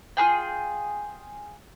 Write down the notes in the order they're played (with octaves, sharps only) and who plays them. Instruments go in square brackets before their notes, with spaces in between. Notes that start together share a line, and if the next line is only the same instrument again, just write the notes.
[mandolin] F4 F#4 G#4 G5